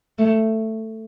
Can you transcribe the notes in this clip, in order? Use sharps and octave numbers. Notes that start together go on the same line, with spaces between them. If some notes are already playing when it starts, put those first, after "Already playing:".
A3